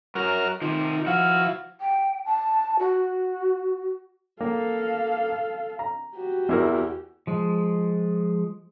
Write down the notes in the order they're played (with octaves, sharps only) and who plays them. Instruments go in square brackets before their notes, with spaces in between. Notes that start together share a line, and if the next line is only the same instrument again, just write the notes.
[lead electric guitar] F#2 [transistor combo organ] F#4 A#4 F6
[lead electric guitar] C3 F3 [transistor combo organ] D#3
[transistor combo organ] F3 E4 [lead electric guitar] F#4 [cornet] F5
[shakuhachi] G5
A5
F#4
[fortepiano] A#3 [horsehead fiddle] A4 F5
[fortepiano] A#5
[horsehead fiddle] F#4 G4
[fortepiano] E2 E4 A#4
[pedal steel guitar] F3 G#3